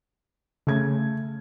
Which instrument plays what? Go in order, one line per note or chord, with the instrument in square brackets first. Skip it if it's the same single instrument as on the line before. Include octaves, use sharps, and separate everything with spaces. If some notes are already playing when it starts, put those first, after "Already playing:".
[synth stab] C#3 [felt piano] A3 G#6